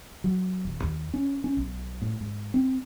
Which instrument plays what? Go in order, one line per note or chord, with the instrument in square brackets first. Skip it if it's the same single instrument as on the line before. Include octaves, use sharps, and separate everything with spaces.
[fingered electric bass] F#3
D#1
D#2
C#4
C#4
B1
A2
G#2
C4